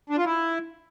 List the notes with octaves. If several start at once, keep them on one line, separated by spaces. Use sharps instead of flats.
D4
F4
E4